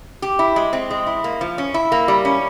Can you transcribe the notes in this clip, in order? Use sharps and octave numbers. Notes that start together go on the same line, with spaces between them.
G4
E4
G#3
C4
G#3
E4
A#3
F3
C#4
E4
A#3
G3
C#4